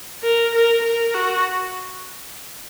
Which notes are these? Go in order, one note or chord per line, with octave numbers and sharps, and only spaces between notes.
A#4
A#4
A#4
F#4